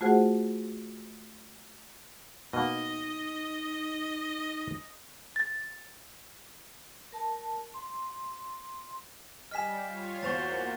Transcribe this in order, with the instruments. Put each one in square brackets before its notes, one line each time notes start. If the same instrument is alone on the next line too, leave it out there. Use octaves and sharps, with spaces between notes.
[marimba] A3 F4 F#4 G#4 C5 F#5
[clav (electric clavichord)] B2 A#3 [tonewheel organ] D#4 [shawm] D#5
[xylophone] A6
[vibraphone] A#4 A5
C6
[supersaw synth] G3 [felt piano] D#5 G#5 [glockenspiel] F6 B6 E7
[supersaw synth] F4 C#5 F5
[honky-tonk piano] E2 C5 C#6 [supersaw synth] A#3 F#4 [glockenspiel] A6 F7 G7